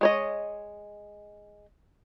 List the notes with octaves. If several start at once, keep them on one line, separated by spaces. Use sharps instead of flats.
G#3 C#5 D#5